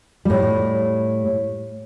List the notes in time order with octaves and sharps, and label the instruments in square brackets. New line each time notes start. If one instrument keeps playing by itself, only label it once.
[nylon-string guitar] A2 G3